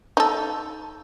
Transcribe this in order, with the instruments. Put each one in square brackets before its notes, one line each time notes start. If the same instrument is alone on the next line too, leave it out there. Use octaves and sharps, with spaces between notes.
[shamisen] D#4 A4